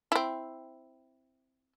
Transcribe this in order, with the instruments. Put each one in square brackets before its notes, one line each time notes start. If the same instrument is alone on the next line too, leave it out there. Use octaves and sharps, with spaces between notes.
[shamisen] C4 E4